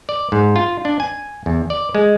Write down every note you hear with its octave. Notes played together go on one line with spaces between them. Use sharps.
D5
G#2
F4
D4
G#5
E2
D5
G#3